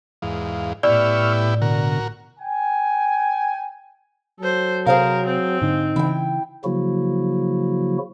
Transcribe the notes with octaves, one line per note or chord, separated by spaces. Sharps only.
E2 G#2 F5
A2 B3 E4 G4 D5 C#6 E6 F6
B2 D3 F#4 A#4
G5 G#5
F#3 A4 C5
C3 G#4 A#4 C5 F5
C4
G#2 D3 D4 D#4
C#3 E3 E4 G5
C#3 F3 F#3 A#3 E4 F#4